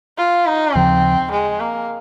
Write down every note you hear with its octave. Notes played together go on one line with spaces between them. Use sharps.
F4
D#4
D#2 C#3 F3 C4
G#3
A#3